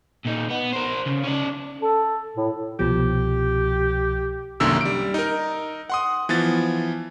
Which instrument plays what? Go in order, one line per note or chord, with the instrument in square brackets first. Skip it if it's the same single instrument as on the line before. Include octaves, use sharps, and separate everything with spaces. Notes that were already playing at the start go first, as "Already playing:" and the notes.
[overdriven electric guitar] A#2 D#4
B3
A#4 C5
C#3
C#4 D5
[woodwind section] A4
A2
[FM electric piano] C2 B2 F3 [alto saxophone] G4
[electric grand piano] C2 F#2 D3 D#3 A#3 E6
G3 D7
D#4 A#4
F#5 C6 D#6
E3 F3 B3 A6